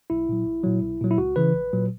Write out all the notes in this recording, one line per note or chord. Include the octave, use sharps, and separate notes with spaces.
B1 E4
A#2 F#3
A#1
A#2 F#3
B1
A#2 F#3
E4
C#2 F#4
C#3 E3 B4
A#1
A#2 F#3